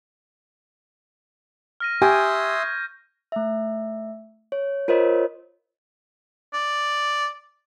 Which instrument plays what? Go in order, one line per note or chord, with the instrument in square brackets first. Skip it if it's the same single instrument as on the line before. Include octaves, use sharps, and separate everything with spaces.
[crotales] F6 A#6 D#7
[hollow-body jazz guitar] G4 [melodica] E5 C6 D#6 [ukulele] G#5 [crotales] C#6 G6 G#6
[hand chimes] A3 E5
C#5
F4 A#4 C5 C#5 D#5
[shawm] D5